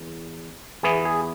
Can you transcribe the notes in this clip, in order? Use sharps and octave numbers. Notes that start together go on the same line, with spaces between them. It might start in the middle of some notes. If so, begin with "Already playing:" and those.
Already playing: E2
E2 E3 B3 G#4
G#4